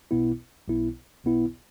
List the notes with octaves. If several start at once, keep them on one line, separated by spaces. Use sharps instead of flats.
B1 B2 B3 E4
B1 B2 B3 E4
B1 B2 B3 E4